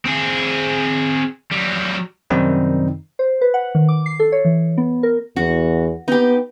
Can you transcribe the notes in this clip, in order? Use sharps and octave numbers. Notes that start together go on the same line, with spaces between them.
C4 G#4
F#3 G3
F#2 C3 D#3 G3 C4 D#4
C5
B4
F#5
D#3
D6
C7
A4
C#5
E3
B3
A#4
E2 F#4
B3 D#4 G4